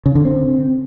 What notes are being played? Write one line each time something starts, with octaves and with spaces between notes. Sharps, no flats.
C#3
D3
C4